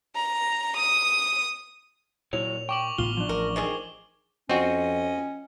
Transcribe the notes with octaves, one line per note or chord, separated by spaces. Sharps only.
A#5
D#6
A#2 F#3 E4 C#5 F7
G5 C#6 D6 F#7
A1 A2 B3 F4 G7
F3 D4
A1 A#4
D#3 C4 G#4
F2 C4 C#4 F#4 D#5